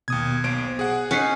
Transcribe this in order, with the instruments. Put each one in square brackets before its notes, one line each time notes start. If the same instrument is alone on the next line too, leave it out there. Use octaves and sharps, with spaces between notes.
[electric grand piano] D#2 D#6 G#6 [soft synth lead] B2
[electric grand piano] B1 C5 D7
G#4 F#5
[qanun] C#4 D#4 [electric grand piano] F#6 B6 C7